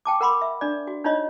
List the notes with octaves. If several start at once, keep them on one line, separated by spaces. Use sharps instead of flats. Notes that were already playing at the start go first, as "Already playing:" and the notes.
G5 A5 D6
A#4 F#5 B5 C6 D6
E5
D4 D5
F#4
D4 D#4 F4 C#5 D#5